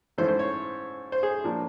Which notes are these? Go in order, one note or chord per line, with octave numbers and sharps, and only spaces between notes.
G#2 E3 A3 C#4 E4 C5
C5
C#5
C5
G#4
A2 F3 A#3 D4